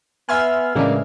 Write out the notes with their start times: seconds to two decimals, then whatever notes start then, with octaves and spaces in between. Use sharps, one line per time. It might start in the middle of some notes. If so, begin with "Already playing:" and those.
0.29 B3 E5 G#5 C6 F6
0.75 A2 C#3 E3 G#3 A#3 D4